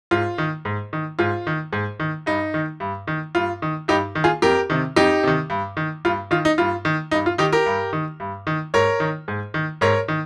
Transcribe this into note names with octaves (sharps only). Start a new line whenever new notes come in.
G#2 F4
D#3
G#2
D#3
G#2 F4
D#3
G#2
D#3
G2 D#4
D#3
G2
D#3
G2 F4
D#3
G2 D#4 G4
D#3
F4 G#4
F2 G4 A#4
C3 D#3
F2 D#4 G4
C3 D#3
G2
D#3
G2 F4
D#3 F4
D#4
G2 F4
D#3
G2 D#4
F4
D#3 D#4 G4
G4 A#4
G2
D#3
G2
D#3
G#2 A#4 C#5
D#3
G#2
D#3
G#2 A#4 C#5
D#3